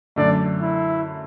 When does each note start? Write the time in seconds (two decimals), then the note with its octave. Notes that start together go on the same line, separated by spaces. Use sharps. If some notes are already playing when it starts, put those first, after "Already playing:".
0.16 F#2 D3 A3 D5
0.62 E4